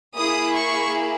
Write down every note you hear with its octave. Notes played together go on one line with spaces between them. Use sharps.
A#3 E4 G#4 D#6
C#6